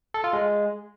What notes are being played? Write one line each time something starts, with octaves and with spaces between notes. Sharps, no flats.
A4
F4
G#3